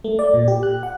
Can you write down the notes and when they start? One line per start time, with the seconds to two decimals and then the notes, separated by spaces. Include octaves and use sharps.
0.04 A3
0.19 D5
0.34 A#2
0.48 G4
0.63 F#6
0.83 F#5